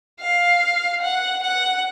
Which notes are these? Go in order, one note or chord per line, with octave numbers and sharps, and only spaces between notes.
F5
F#5
F#5